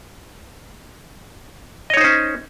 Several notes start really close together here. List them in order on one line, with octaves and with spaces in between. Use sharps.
D#5 C#5 D#4 C5 C#4